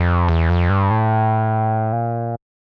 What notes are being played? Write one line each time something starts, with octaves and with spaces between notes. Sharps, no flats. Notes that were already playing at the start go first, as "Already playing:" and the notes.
Already playing: F2
E2
F2
G2
A2
A#2